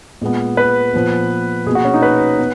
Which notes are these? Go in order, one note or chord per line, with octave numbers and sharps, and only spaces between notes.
A#2 G#3 B3
B4
A#2 F3 B3
B2 A#3 F#4 G#4
C#4
D#4
B4
B3